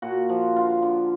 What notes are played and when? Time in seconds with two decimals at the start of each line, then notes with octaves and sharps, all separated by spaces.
0.02 A#2 F#4
0.29 F3
0.56 D3 F4
0.82 D3